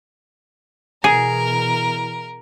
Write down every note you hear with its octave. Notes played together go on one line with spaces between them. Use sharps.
B2 E3 G#4 A#4